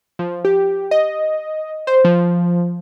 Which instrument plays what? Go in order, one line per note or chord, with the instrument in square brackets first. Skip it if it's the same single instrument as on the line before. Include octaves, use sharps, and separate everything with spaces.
[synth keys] F3
G4
D#5
C5
F3